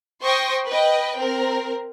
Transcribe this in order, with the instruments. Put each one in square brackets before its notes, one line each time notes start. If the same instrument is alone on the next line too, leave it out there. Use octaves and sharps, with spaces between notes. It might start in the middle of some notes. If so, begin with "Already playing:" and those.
[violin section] C5 G5 C6 C#6 D#6 A#6
B4 D#5 G5
C4 A#4